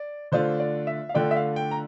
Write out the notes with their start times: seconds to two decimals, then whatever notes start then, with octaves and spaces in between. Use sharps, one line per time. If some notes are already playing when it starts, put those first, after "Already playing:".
Already playing: D5
0.32 D3 A3 D4 F4 C5
0.60 D5
0.87 E5
1.09 F5
1.14 D3 A3 D4 F4 G5
1.31 E5
1.36 F5
1.56 G5
1.71 A#5